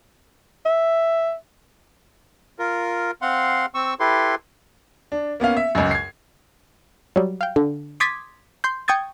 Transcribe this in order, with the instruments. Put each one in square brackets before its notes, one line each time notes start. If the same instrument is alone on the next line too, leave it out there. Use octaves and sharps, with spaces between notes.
[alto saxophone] E5
[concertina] F4 A#4
C4 F5 F#5 C6
C4 C#6 E6
E4 G4 A4 B4 C6
[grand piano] D4
A#3 B3 C#4 F5
E5
C#2 F#2
G#6 C7
[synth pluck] F#3 G3
F5 G5
D3
C6 D6 D#6 G#6 A6 B6
C6 G6
G5 C#6 D#6 G#6 A6